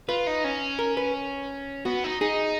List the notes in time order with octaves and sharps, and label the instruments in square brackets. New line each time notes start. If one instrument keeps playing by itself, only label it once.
[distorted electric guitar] F4 [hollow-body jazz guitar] B4
[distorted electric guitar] D#4
C#4
[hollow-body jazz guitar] A#4
B4
[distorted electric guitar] B3 [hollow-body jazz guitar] F#4
[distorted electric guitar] D#4
[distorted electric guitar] D#4 [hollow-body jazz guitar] G#4